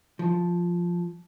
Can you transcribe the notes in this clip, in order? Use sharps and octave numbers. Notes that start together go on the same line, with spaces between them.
F3